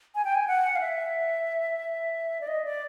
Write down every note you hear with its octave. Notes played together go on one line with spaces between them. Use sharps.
G#5
G5
G#5
F#5
F5
E5
D5
D#5
D5